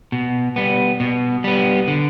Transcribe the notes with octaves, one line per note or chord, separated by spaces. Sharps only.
B2
G3 B3
B2
G3 B3
D3